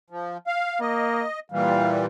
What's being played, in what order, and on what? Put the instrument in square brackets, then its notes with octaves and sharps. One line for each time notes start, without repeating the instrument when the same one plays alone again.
[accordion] F3
F5
[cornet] A#3 [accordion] D#5
[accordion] A#2 E3 G3 [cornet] F5